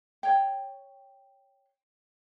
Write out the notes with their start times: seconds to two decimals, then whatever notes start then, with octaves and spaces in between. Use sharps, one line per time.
0.23 C#5 G5